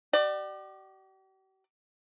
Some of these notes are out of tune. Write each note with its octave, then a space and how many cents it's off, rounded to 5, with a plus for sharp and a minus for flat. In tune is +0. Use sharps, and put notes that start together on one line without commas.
G4 -45 D5 +25